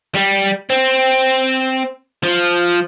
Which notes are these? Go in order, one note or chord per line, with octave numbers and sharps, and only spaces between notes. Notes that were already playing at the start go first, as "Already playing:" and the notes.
G3
C4
F3